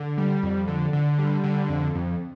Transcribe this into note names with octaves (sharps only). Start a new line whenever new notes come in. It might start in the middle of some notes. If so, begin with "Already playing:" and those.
Already playing: D3
G3
F2
D3
D3
G3
D3
F2
F2